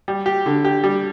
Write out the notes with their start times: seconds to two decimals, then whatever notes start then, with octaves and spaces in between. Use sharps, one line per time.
0.08 G3
0.26 G4
0.46 D3
0.65 G4
0.84 G3